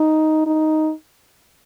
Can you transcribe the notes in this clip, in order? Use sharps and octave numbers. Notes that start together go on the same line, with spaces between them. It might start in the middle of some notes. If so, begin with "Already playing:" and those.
Already playing: D#4
D#4